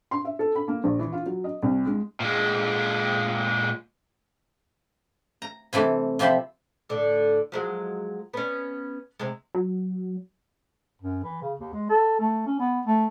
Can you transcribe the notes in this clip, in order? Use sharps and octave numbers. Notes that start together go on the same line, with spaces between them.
C6
E5
A4
B5
A#3
A#1
E3
F4
F#3
D#5
C2
G#3
A#2 G#3
A#5
C3 E3 A3 D4
C3 F3 G4 E5 B5 C6
A2 D3
F3 F#3 G#3
B3 C#4
C3 G#3
F#3
F#2
E3
C#3
D#2
G#3
A4
A3
C#4
B3
A3